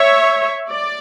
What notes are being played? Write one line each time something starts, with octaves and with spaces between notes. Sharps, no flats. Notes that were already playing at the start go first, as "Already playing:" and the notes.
Already playing: C#5 E5
D5